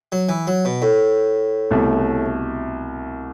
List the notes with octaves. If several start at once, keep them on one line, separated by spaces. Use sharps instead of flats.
F#3
E3
F#3
B2
A2
C2 B2 A3